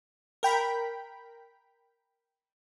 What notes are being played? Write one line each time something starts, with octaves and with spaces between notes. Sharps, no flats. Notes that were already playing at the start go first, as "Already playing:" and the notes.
A#4 G5 B5